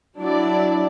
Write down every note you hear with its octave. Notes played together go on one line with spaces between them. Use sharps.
F#3 D4 E4 D5